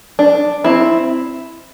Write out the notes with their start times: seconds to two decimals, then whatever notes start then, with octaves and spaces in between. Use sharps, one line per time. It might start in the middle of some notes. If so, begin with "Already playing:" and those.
0.19 D4
0.64 C4 E4